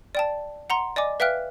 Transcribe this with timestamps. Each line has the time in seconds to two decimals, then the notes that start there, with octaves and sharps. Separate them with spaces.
0.15 D5 G5 A5
0.70 F#5 A#5 C6
0.96 D5 D#5 G#5 D6
1.20 B4 E5 F5 G5 F6 F#6